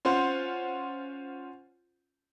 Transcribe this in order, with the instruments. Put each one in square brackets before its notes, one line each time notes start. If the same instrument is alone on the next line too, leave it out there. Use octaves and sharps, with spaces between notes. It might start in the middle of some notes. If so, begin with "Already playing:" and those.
[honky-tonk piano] C#4 F4 C5 F#5